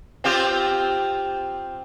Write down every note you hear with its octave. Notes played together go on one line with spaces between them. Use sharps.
C4 F4 G4